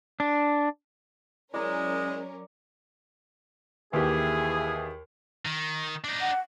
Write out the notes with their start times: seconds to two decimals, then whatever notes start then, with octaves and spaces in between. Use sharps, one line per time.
0.20 D4
1.54 F#3 G#3 C#4 E4 A#4 D5 A#5
3.93 D#2 E3 G4 G#4
5.45 D#3
6.04 D4 D#4
6.21 F#5